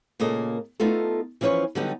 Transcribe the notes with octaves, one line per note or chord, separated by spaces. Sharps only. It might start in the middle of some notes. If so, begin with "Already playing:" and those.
A#2 C#3 A#3 A4 D#5
A3 B3 D#4 F4 A4
E3 F3 C#4 A#4 B4 C#5
D3 F#3 G3 B3 D#4 G4